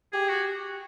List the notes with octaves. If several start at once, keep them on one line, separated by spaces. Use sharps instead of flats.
G4 G#4
F#4